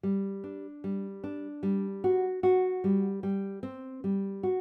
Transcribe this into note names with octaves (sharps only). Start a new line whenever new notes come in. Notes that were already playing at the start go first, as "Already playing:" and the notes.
G3
D4
G3
D4
G3
F#4
F#4
G3
G3
C4
G3
F#4